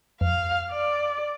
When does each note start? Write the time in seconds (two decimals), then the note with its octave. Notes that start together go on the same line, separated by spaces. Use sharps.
0.21 F2 F5
0.72 D5